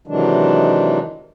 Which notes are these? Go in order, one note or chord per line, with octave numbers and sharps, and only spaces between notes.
C3 D#3 E3 F#3 G#3 D4